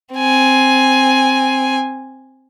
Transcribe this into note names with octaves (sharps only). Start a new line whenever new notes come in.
C4 G#5